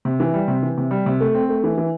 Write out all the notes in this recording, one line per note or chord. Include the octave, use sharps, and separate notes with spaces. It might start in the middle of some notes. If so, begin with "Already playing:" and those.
C3
E3
G3
C3
E3
C3
G3
C3
A3
C4
A3
E3
E3